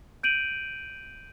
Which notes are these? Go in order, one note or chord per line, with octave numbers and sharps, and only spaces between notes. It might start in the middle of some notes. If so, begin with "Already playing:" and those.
G6 D7 D#7 F#7